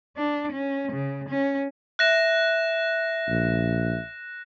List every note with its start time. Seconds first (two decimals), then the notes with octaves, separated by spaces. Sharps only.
0.17 D4
0.52 C#4
0.92 C#3
1.29 C#4
1.99 E5 F#6 A#6 E7
3.29 A#1